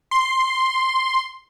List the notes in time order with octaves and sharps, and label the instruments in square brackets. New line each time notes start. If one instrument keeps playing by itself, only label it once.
[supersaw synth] C6